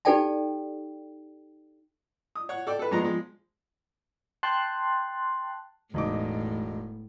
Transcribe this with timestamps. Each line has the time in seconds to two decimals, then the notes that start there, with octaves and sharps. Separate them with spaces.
0.05 D#4 G4 A4 D5 G5 A5
2.35 D#6
2.49 C#5 F#5
2.67 A4 D5 G5
2.79 A4 B4
2.91 G2 A#2 F3 G#3 B3 A#5
3.05 F3 G#3
4.43 G5 A5 C6 F#6
5.94 E1 A2 D#4 D6